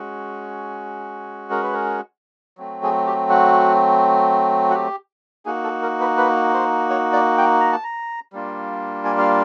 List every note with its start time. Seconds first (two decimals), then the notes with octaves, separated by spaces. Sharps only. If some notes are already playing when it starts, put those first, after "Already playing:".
Already playing: G#3 C#4 F#4
1.50 A#4
1.63 B4
1.73 A#4
2.58 F#3 A3 C4
2.83 G#4
3.07 G4
3.30 F#4
4.70 F#4
4.74 G4
5.45 A#3 D#4 F#4 G#4
5.64 A4
5.82 A#4
6.00 B4
6.17 B4
6.54 C5
6.90 C#5
7.13 D5
7.38 G5
7.61 A#5
7.72 A5
7.84 A#5
8.33 G3 A#3 D4 F4
9.05 G#5
9.18 F5